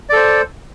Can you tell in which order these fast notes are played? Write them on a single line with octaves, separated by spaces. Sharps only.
D5 A4 C5